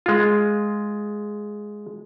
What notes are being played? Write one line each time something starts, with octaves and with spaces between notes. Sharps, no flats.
G#3 F4